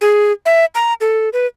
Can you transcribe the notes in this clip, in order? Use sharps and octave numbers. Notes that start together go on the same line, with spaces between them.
G#4
E5
A#5
A4
B4